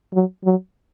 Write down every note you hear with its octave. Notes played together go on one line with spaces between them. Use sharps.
F#3
F#3